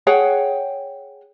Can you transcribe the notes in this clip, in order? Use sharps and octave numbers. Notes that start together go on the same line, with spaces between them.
G#4 C#5 F#5 G5